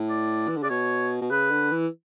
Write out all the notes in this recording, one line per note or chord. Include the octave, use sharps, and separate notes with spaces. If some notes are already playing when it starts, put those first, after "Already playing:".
Already playing: A2
D5
E3
D3
C#3 D5
B2 C#5
B2
C#3 B4
D3
E3